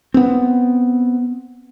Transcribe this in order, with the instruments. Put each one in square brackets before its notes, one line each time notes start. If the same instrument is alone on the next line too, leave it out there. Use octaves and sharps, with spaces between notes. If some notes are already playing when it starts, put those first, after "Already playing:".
[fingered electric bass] B3 C4